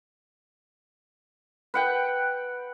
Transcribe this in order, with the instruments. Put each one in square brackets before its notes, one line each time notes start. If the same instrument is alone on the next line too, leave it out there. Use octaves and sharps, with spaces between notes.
[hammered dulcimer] B4 F#5 G5